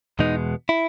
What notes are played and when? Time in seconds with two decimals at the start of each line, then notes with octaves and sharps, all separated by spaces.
0.19 E2 B2 G#3 B3 D#4
0.69 E4